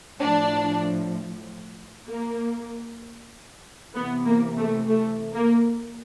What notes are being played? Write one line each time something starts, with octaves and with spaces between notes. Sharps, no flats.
A2 F3 D4
A#3
C3 E3 B3
A#3
A3
A3
A#3